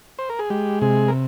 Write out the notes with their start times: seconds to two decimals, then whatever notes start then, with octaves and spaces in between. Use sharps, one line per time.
0.19 C5
0.30 A#4
0.39 G#4
0.50 G#3 G4
0.82 C3 G#4
1.08 A#4